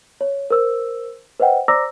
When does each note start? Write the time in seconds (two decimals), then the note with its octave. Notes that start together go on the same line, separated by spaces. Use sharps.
0.21 C#5
0.50 A#4 C5 E6
1.40 B4 C5 D#5 F#5 G5
1.68 C5 D5 A#5 D6 E6 A#6